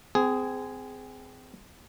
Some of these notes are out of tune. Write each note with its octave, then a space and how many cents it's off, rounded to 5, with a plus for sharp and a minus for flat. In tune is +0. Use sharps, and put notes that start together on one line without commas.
C4 -30 G#4 +0